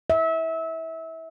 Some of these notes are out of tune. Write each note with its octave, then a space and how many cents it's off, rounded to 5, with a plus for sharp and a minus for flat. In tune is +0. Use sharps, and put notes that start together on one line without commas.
E5 -25